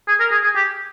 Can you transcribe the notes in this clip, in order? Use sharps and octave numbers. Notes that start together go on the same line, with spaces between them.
G#4
A#4
G#4
G#4
G4